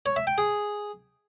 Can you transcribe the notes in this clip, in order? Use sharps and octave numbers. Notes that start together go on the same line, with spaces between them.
C#5
E5
G5
G#4